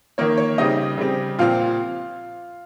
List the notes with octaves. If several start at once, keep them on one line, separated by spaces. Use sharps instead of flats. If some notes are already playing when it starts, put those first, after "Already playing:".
D#3 A#3 C#5
C#5
C#3 G3 C4 D#4 D#5
C#3 G3 C4
A#2 F3 C4 F4 F5